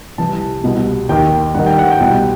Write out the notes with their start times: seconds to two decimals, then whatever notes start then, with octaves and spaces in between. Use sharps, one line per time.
0.18 C2 C3 E3 A5
0.64 C2 B2
1.09 D#2 D#3 G5
1.55 G2 D#3 F#5
1.67 G5
1.79 F#5
1.91 G5
2.00 C2 B2 F#5